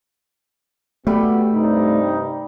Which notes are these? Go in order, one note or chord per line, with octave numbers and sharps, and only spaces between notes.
G3 A3 B3 F#4 G4 B5
G2 C3 D#4